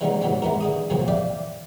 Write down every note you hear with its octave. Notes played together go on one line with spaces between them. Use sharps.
E3 G3 G#3 B3 C#4 D#4
G#2 E3 F#3 B3 C4
G#3 B3 E4 A#4
D3 G#4 D#6
C2 F2 A#2 C#3 F#3 C4
D5 E5 F5 G5